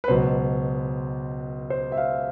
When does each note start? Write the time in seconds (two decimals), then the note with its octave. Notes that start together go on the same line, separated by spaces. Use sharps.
0.04 B4
0.08 C#2 B2 F#3 C5
1.70 C5
1.92 E5
1.97 F5